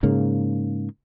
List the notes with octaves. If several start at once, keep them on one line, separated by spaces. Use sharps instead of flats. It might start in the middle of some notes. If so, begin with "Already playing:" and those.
G#2 C#3 A#3